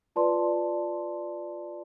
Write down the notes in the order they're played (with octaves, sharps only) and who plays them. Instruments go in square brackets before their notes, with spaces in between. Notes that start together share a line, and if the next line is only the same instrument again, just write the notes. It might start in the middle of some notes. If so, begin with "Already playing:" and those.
[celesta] F4 B4 D5 A5 C6